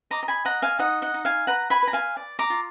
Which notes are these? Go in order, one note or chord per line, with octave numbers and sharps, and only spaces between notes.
D#5 A#5 D6
A#5
G#5 B5
D#5 F#5 A#5
F5 G#5
D#4 D#5 F#5
D#5 F#5
D#4
F5 G#5
B4 F#5 A#5
G#5 B5
B4
A#5
F5 G#5
D5
A#5 D6
F4